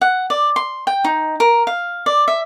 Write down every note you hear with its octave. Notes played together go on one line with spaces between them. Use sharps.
F#5
D5
C6
G5
D#4
A#4
F5
D5
E5